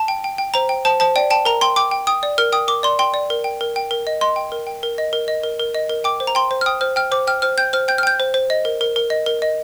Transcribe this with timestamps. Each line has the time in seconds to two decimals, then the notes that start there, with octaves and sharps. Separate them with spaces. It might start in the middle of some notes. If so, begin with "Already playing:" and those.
Already playing: A5
0.08 G5
0.24 G5
0.38 G5
0.54 C5 A#5
0.69 G5
0.85 C5 A5
1.00 C5 A5
1.16 D5 G5
1.30 G5 A5
1.45 A#4 A#5
1.61 G5 C6
1.76 G5 D6
1.91 G5
2.07 G5 D#6
2.23 D5
2.38 A#4 F6
2.52 G5 D#6
2.68 A#4 D6
2.83 D5 C6
2.99 G5 C6
3.14 D5
3.30 A#4
3.44 G5
3.61 A#4
3.76 G5
3.91 A#4
4.07 D#5
4.21 D#5 C6
4.36 G5
4.52 A#4
4.67 G5
4.83 A#4
4.98 D#5
5.13 A#4
5.28 D#5
5.44 A#4
5.60 A#4
5.75 D#5
5.90 A#4
6.04 G5 D6
6.20 C5
6.27 A#5
6.35 G5 C6
6.51 C5
6.61 F6
6.66 G5 D#6
6.81 C5 F6
6.96 G5 F6
7.12 C5 D6
7.27 G5 F6
7.42 C5 F6
7.58 G5 G6
7.73 C5 F6
7.88 G5 G6
7.98 F6
8.03 G5 G6
8.20 C5
8.34 C5
8.50 D#5
8.65 A#4
8.81 A#4
8.96 A#4
9.10 D#5
9.26 A#4
9.42 D#5